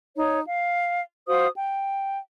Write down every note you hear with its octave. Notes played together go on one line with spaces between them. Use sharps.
D#4 C#5
F5
F#4 C5 F5 D#6
G5